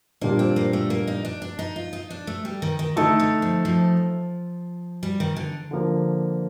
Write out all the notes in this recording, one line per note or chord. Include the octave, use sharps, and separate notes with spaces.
A#2 G3 A#3 D4
C4
A#3
A3
A#3
D#4
D4
D4
D#4
F4
D#4
D4
A3
G3
D#3
D#3
D3 A3 D#4 A4
D3
F3
F3
G3
D#3
D3
D3 F3 A#3